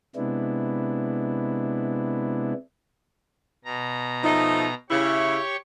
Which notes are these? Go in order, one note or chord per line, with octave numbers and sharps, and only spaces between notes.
C3 G#3 B3 D4 E4
B2 A#5
F3 A3 D#4
C#3 E4 G4 C#5 C#6